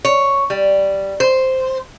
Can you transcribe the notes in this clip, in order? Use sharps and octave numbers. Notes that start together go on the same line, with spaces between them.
C#5
G3
C5